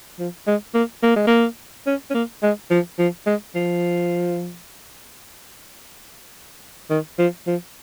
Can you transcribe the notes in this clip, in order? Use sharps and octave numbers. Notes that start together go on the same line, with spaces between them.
F3
G#3
A#3
A#3
G#3
A#3
C#4
C#4
A#3
G#3
F3
F3
G#3
F3
D#3
F3
F3